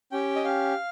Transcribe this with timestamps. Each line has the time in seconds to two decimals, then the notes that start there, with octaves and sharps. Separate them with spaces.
0.12 C#4 G4 G5
0.36 D#5
0.44 F5